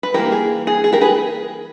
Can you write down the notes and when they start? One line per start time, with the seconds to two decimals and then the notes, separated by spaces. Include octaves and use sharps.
0.03 B4
0.14 E3 G3 A#3 G4 A#4
0.32 G#4
0.67 G#4
0.84 G#4
0.93 G4 A#4
1.01 G#4 B4